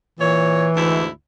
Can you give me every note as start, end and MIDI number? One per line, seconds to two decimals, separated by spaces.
0.19 0.68 46
0.19 1.03 52
0.19 0.68 73
0.76 1.07 38
0.76 1.07 44
0.76 1.07 64